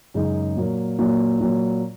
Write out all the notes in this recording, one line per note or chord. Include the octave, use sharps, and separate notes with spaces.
F#2 C#3 G#3 D#4
A#2 F#3 A#3
A#2 F#3 A#3
A#2 F#3 A#3